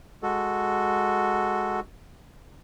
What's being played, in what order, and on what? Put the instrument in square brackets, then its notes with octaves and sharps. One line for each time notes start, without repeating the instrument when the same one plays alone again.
[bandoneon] G#3 F#4 A4